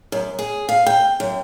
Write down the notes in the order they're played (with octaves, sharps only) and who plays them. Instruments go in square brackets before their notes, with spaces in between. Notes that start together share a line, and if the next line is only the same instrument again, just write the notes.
[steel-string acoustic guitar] F#2
G#4
F5
G5
F#2